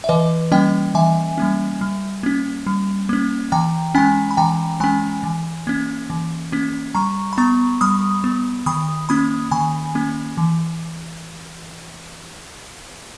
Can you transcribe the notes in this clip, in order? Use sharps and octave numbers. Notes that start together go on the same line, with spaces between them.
E5
E3 B4 D#5
G3 A#3 C#4 D#5 G5
E3 E5 G#5
G3 A#3 C#4
G3
A#3 C#4
G3
A#3 C#4
E3 G5 A#5
G#3 C#4 G#5 B5
B5
E3 G5 A#5
G#3 C#4 G#5 B5
E3
A#3 C#4
E3
A#3 C#4
G3 A#5 C#6
B5
B3 A#5 C#6
G3 B5 D#6
B3
D#3 B5 D#6
A#3 C#4 B5 D#6
D#3 G#5 B5
A#3 C#4
E3